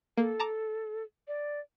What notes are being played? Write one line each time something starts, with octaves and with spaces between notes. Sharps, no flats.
A#3 A4
A5 A#5 D6
D5